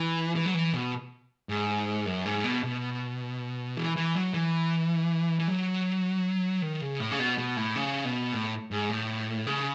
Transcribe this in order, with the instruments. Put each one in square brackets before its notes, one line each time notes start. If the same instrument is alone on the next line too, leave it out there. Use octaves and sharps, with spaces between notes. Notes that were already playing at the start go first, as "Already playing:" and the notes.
Already playing: [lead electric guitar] E3
E3
F#3
E3
B2
G#2
F#2
G#2
B2
B2
E3
E3
F#3
E3
E3
F#3
D#3
C#3
A2
C#3
B2
B2
A2
C#3
B2
A2
G#2
A2
C#3